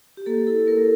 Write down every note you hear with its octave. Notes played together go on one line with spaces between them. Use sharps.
G4
A#3 A4
E4 A4
A#3 A#4